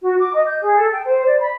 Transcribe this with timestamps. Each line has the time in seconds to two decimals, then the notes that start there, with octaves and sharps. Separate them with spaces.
0.03 F#4
0.18 D6
0.34 D#5
0.46 G6
0.62 G#4
0.75 A4
0.93 G5
1.05 C5
1.26 D5
1.40 B5